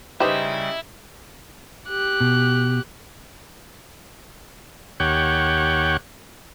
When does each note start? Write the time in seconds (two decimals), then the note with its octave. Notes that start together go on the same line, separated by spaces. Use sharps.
0.20 C#3 G3 D#4 E4 G4 B4 C5 D#5
1.89 G4 F#6
2.20 B2
5.00 D#2 G4 C#5 F#5